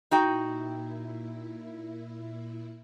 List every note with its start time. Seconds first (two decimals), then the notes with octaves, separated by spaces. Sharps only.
0.11 A#2 D#4 E4 F#4 G5